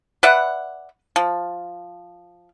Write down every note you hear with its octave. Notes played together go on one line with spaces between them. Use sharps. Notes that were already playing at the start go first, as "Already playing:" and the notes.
B4 D5 E5 F#5
F3